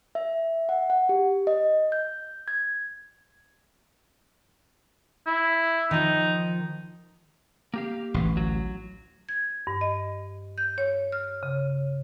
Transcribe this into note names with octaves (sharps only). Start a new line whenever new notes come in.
E5
F#5
F#5
G4
D#5
G6
G#6
E4
D#3 F3 D#4
A#3 G4 F5
A1 D2 E3
F#3
G#6
G2
D#5
G6
C#5
F6
C#3